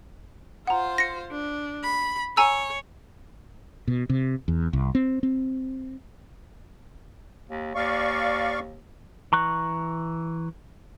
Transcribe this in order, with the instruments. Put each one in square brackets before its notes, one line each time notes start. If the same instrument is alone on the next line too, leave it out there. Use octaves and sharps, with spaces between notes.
[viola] F4 C5 [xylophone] F#5 A#5
[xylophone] A#6 C#7
[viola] D4
B5
[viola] C#5 [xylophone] G#5 A#5 E6
[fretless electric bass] B2
C3
E2
C2
C4
C4
[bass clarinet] D#2
[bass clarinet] D#2 [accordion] D5 F5 C#6
[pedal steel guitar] E3 A#5 C#6 F#6